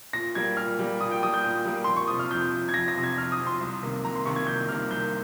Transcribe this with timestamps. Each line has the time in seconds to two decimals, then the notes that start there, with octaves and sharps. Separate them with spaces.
0.13 A#2 A#6
0.35 G3 A#3 G#6
0.57 A#2 F6
0.79 G3 A#3
1.01 A#2 D#6
1.11 G5
1.22 G3 D#6
1.27 A#3
1.34 G6
1.44 A#2
1.65 G3 A#3
1.84 F2 C6
1.96 C#6
2.07 C3 F3 D#6
2.19 F6
2.31 F2 G6
2.52 C3 F3
2.69 G#6
2.74 F2 A#6
2.88 A#6
2.95 C3 F3
3.04 G#6
3.18 F2 F6
3.32 D#6
3.39 C3 F3
3.47 C6
3.61 C2
3.82 C3 D#3 A#3
4.04 C2 A#5
4.15 C6
4.25 C3 D#3 A#3 C#6
4.36 G#6
4.47 C2 G6
4.69 C3 D#3 A#3 F6
4.90 C2 G6